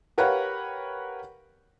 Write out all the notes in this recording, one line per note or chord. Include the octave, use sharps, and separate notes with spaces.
G4 A#4 B4 C#5 F5 F#5